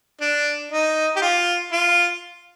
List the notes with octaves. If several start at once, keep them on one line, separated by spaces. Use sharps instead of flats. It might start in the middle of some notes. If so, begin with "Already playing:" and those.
D4
D#4
G4
F4
F4